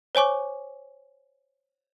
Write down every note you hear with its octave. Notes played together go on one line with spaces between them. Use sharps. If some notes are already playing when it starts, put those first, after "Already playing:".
C5 C#5 G#5 C#6 D6